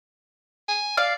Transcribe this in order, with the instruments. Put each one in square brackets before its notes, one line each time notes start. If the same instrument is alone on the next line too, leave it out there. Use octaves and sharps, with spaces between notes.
[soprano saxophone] G#5
[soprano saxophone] D5 [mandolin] F5